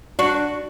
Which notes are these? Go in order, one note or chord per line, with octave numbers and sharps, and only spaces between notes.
D4 F#4